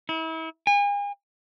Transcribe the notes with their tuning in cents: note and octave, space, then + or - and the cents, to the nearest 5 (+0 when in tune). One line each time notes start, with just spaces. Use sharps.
E4 -35
G#5 -40